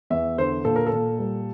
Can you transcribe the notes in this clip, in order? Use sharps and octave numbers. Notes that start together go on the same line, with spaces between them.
E2 E5
D3 C5
A#2 A4
A#4
A4
A#2
G3